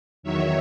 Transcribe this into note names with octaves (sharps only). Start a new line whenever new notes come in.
E2 D#3 F#3 C#5 E5